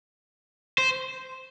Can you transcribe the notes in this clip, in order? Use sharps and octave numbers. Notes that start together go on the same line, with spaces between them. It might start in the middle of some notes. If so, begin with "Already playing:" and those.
C5